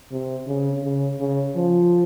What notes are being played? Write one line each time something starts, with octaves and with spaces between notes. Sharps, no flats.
C3
C#3
C#3
C#3
F3